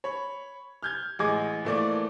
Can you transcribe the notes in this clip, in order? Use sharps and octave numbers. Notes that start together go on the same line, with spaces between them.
C#5 B5
F6 G6 G#6
A1 G#3 G#4 D#5 D6 G#6
E3 F3 A3 A#3 D5